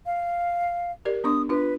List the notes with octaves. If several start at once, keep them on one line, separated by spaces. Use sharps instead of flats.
F5
G4 A#4 D5
B3 D4 C#6 D#6
D4 F4 B4